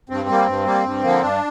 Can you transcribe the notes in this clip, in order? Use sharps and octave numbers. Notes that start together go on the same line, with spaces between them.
G2 C4
G3 A#3
G2
G3 A#3
G2
D3 F3 A#3
G2 D4